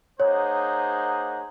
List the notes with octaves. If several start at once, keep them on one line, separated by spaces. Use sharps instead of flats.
A#3 D#4 G#4 C5 C#5 F#5